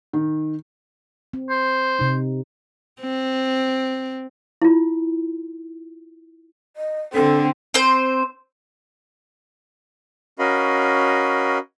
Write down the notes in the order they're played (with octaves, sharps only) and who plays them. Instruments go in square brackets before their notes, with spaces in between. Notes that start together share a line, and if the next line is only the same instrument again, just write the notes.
[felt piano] D#3
[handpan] C4
[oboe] C5
[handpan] C3 D#4
[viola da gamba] C4
[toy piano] E4 F4
[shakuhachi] D#5
[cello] D3 [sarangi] C4 [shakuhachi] A4
[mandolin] C4 C5
[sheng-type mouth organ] C#4 F#4 A#4 D#5 F5 B5